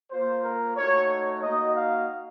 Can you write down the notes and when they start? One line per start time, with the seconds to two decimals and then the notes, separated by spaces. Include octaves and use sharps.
0.11 A#3 F4 C5
0.44 A#4
0.77 A3 D#4 F#4 C#5
1.10 C#5
1.43 A#3 D#4 F#4 D#5
1.76 F5